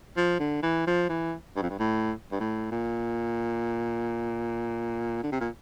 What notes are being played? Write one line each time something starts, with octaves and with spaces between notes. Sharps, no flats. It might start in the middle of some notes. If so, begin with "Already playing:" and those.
F3
D3
E3
F3
E3
G2
F2
G2
A2
G2
A2
A#2
D3
C3
A#2